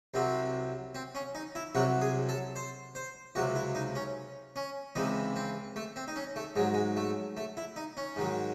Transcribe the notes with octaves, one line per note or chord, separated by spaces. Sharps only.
C2 C3 F#3 C4
C4
C#4
D#4
E4
C2 C3 F#3 F#4
G#4
A4
C5
C5
C#2 C3 F#3 F#4
E4
D#4
C#4
C#4
C#2 C3 E3 D#4
C4
A3
C4
D#4
C#4
A3
G#2 F#3 G#3
G#3
A3
A3
E4
D#4
C#4
G#2 D#3 F#3